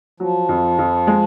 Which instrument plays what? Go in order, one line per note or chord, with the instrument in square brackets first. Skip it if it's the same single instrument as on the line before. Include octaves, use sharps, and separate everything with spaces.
[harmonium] F3 [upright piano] F#3
[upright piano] F2
F2
G#3